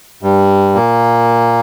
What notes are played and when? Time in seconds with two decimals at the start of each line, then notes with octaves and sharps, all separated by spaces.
0.23 G2 G3
0.74 A#2 A#3